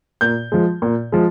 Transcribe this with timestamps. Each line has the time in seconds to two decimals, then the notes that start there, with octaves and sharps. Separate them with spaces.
0.21 A#2 G6
0.52 F3 G#3
0.82 A#2
1.12 F3 G#3